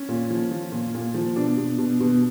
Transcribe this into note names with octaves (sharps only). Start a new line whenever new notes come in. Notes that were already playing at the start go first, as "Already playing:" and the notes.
Already playing: C#4
A#2
F3
F3
A#2
A#2
F3
B2 D4
B2
B2
B2